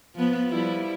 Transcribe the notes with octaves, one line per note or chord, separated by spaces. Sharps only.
F3 B3
F3 G3 E4